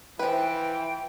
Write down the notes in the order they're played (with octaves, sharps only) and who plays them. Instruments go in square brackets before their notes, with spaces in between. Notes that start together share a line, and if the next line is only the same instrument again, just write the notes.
[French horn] E3 [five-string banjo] F3 B4 [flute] G5